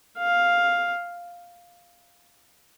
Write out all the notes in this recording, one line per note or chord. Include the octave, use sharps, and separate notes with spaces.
F5